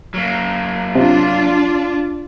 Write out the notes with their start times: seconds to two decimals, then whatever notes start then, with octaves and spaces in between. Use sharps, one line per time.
0.14 F#3 A#3
0.95 C3 D4 F4